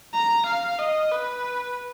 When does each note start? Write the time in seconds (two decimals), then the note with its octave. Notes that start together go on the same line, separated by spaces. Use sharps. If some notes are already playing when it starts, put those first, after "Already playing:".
0.14 A#5
0.46 F5
0.79 D#5
1.12 B4